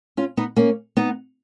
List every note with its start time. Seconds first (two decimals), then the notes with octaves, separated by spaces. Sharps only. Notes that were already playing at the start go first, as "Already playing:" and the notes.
0.17 C#4 F4
0.37 B3 D#4
0.56 A#3 C#4
0.97 B3 D#4